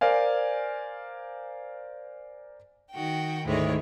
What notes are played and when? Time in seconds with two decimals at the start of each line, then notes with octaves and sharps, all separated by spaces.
0.01 A#4 C5 D5 F5 G#5
2.91 D#3 F#4 G5
3.44 D2 G#2 D#3 G#3 E4 C#5